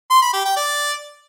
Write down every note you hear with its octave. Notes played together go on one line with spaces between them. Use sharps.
C6
B5
G4
G5
D5